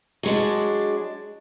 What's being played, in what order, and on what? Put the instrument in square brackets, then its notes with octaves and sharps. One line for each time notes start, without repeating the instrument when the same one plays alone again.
[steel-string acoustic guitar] F#3 G#3 D4